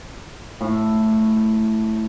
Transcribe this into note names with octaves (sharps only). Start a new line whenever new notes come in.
A2